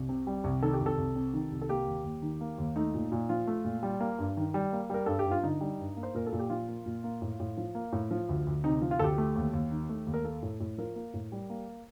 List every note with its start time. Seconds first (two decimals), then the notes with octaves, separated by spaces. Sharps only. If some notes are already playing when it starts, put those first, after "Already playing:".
Already playing: C2
0.09 C3
0.27 G3
0.44 C2
0.62 D#3 A4
0.73 G4
0.81 C2
0.86 A4
0.98 C2
1.15 C3
1.33 D#3
1.52 C2
1.62 A4
1.69 A#3 G4
1.87 D#2
2.04 D#2
2.22 D#3
2.41 A#3
2.58 D#2
2.76 A3 D#4
2.94 A#2
3.12 A#2
3.29 F3 F4
3.47 A3
3.64 A#2
3.83 G3
4.00 A#3
4.18 G2
4.37 D#3
4.54 G3
4.72 A#3
4.90 G3 A#4
5.06 G2 A4
5.19 G4
5.26 G2
5.31 F4
5.43 D3 D#4
5.61 G3
5.80 G2
5.97 A#3
6.03 C5
6.14 A#2 A#4
6.26 A4
6.32 A#2
6.39 G4
6.50 F3 F4
6.68 A#3
6.86 A#2
7.04 A#3
7.22 A2
7.40 A2
7.57 F3
7.75 A#3
7.92 A2
8.11 F3
8.29 D2
8.47 D2
8.64 C3 D#4
8.82 F3
8.91 F4
8.99 D2 G4 A4
9.18 A3
9.36 D#2
9.53 D#2
9.71 D#3
9.89 A3
10.07 D#2
10.14 A#4
10.24 A#3 A4
10.42 A2
10.60 A2
10.78 F3 A#4
10.96 A#3
11.14 A2
11.32 G3
11.50 A#3